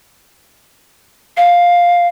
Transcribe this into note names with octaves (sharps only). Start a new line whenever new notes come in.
F5